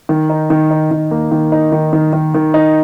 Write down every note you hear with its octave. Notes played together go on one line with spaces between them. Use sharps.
D#3
D#4
D#3
D#4
D#3
A#3
D#3
D#4
D#3
D#3
D#3
D#3
D#4